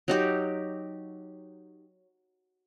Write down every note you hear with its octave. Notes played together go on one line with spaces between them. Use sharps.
F#3 D#4 G4